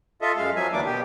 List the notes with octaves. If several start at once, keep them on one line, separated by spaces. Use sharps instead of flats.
F4 A4 D#5 E5
F#2 G#3 F5
F3 F#3 E5 G#5
D2 E3 A#3 D4 D6
B2 G4